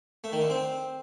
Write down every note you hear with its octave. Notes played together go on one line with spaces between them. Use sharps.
A3
D#3
D3
C4